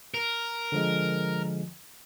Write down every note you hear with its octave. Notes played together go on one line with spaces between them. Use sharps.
A#4
D3 F3 G#3